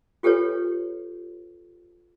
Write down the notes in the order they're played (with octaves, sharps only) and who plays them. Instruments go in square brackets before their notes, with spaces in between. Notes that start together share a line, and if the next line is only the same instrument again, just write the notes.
[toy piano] F4 G4 A4 B4 C#5